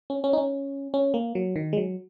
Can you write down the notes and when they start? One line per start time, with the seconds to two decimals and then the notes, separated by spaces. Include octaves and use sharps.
0.10 C#4
0.24 C#4
0.33 D#4
0.38 C#4
0.94 C#4
1.14 A#3
1.35 F#3
1.56 D#3
1.73 G#3
1.77 F#3